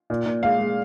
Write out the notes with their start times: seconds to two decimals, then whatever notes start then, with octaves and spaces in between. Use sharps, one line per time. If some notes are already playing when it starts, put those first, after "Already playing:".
0.10 A#2
0.26 A#2
0.43 G#3 F5
0.60 G#3